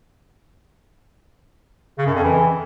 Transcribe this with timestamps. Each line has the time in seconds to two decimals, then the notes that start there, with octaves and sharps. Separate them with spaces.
1.98 C#3
2.07 F#2
2.15 F2
2.23 E3